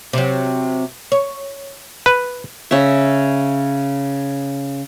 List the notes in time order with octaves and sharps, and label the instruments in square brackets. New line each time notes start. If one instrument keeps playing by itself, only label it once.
[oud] C3 F#3
C#5
[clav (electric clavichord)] B4
[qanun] C#3 E5